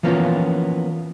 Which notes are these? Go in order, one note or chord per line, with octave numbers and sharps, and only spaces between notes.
E3 F3 A#3 B3 C#4 F4